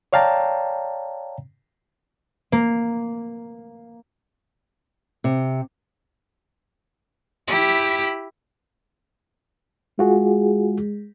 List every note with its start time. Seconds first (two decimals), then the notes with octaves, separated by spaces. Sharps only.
0.13 C#5 D5 F5 G5 A5 A#5
2.52 A#3
5.24 C3
7.47 E4 G4
9.99 G#3 F4 F#4 G#4